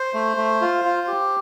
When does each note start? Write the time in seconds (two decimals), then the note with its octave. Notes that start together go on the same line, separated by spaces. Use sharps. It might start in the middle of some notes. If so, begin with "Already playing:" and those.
Already playing: C5
0.14 A3
0.37 A3
0.62 F4
0.85 F4
1.08 G4